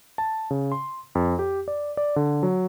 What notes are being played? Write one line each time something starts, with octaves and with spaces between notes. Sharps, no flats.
A5
C#3
C6
F2
G4
D5
D5
D3
F#3